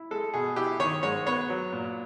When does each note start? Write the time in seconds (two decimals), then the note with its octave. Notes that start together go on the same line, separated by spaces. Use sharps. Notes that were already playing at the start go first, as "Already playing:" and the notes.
Already playing: E4
0.11 G#3 A4
0.34 B2 G#4
0.56 E4 G4
0.80 D#3 C#5
1.03 G#2 C#5
1.27 B3 C#5
1.49 F#3
1.73 A#2